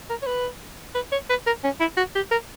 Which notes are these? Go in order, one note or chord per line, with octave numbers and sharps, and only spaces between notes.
A#4
C#5
B4
B4
C#5
B4
A#4
C#4
E4
F#4
G4
A#4